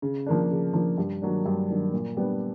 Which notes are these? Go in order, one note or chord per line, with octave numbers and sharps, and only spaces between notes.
C#3
F3 A#3 D4
C#3
F3 A#3 D4
G2
D#3 F#3 A#3 D4
G2
D#3 F#3 A#3 D4
A#2
G3 B3 D4